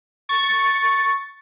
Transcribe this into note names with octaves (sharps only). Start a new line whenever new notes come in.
C#6 A6